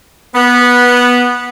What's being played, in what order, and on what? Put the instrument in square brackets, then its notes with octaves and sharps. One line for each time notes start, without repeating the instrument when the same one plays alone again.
[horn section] B3